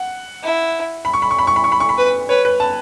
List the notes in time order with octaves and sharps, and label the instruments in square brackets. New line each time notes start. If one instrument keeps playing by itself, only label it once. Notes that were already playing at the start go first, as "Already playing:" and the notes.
Already playing: [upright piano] F#5
[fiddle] E4
[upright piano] B5
C#6
B5
C#6
B5
C#6
B5
C#6
B5
C#6
B5
[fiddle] B4
[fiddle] B4 [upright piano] C#5
[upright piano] B4
A5